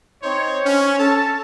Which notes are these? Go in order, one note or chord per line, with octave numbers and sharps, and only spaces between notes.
C4 D#4 C5 C#5
C#4
A4 A5